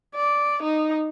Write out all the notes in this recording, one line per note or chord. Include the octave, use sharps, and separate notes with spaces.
D5
D#4